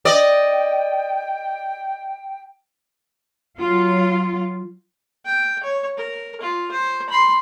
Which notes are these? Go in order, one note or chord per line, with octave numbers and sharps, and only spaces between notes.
D5 D#5 G5
F#3 F4
G5
C#5
A#4
F4
C5
B5 C6